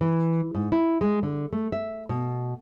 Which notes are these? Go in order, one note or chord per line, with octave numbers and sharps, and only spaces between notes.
E3
G#2
E4
G#3
D3
A3
E5
B2